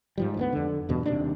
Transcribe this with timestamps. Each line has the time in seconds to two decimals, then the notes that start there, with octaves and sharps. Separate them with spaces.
0.18 G#2 F3 G3
0.37 D2 G3 B3
0.53 F2 D3
0.89 E2 G2 B2
1.06 D#1 D#2 C3 D4